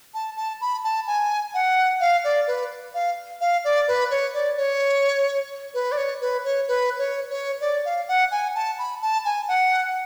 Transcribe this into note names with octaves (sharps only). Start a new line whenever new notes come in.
A5
A5
B5
A5
G#5
F#5
F5
D5
B4
F5
F5
D5
B4
C#5
D5
C#5
B4
D5
C#5
B4
C#5
B4
C#5
C#5
D5
F5
F#5
G#5
A5
B5
A5
G#5
F#5